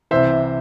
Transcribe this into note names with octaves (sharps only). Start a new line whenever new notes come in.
C2 C3 E3 C5 E5